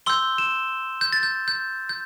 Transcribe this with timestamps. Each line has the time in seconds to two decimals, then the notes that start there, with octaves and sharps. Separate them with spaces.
0.06 C6 E6 G6 G7
0.38 E7
1.01 G6
1.13 A6
1.23 G6
1.48 G6
1.89 G6